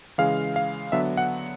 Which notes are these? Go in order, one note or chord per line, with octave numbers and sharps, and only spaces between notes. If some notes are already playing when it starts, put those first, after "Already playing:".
C#3 E3 G#3 F5
F5
D3 F#3 B3 D4 E5
F#5